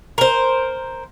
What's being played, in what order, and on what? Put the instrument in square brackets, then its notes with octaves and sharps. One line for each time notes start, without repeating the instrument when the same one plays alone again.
[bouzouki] A#4 C5